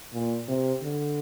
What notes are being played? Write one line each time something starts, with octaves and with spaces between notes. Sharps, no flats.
A#2
C3
D3